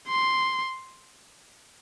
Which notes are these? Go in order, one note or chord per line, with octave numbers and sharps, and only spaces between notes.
C6